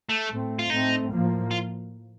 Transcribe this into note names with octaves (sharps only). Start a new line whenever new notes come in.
A3
A2 A3 C4
F4
A2 A3 C4 D#4
A2 F3 A#3
F4